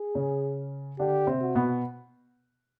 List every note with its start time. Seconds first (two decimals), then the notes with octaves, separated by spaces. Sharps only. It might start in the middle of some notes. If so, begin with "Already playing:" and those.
Already playing: G#4
0.15 C#3 C#4
0.99 D3 D4 G4
1.27 C3 C4
1.41 F#4
1.55 B2 B3